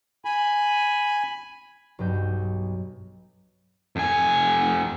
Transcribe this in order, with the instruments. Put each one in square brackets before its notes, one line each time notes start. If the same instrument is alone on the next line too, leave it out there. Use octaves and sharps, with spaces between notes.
[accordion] G#5 B5
[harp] B1 G2 F#3 D#5 G6
[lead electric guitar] F2 G#5